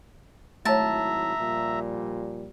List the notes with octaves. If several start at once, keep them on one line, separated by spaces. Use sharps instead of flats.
G#1 F#3 A3 E4 C#5 E5 A5 A#5
A#2 F3 G3